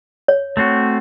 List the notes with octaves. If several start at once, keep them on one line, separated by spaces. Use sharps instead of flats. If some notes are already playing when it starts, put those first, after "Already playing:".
C#5
A3 C4 F#4